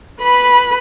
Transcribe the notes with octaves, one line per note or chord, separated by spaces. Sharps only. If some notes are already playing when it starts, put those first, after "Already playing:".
B4 B5